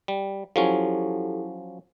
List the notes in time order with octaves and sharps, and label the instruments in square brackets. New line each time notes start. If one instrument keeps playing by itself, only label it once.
[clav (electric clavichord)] G3
[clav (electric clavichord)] F3 F#3 C#4 [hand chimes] E4 G4 A4